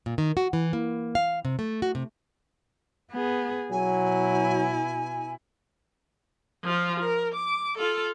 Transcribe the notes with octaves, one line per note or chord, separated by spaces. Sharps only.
A#2
D#3
F#4
E3
A#3
F5
C3
A3
F#4
C3
B3 G#4
B2 F#3 E4 G#5
F3 F4
A#4
D6
F4 A4